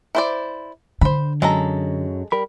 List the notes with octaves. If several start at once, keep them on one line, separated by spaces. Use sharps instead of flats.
E4 C5 D5
D3 C5 B5
F#2 F#3 G#3 A4 A#5
G3 A#4 B5